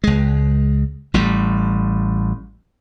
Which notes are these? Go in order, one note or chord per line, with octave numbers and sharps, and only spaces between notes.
C#2 G#3
A1 A2 G3